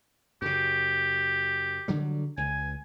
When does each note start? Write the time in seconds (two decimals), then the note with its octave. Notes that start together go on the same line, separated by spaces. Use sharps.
0.42 F#2 C#3 G4
1.88 D3 F#3 G3
2.37 C#2 G#5